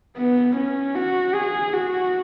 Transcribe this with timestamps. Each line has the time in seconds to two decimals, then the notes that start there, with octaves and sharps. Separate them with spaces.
0.18 B3
0.56 C#4
0.96 F#4
1.35 G#4
1.73 F#4